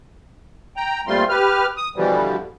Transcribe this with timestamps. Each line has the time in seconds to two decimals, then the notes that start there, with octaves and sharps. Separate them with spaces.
0.76 G5 A#5
1.07 A#2 G3 A3 C4 F4 C6
1.29 G4 B4 F6
1.77 D#6
1.96 B2 D3 E3 F3 G3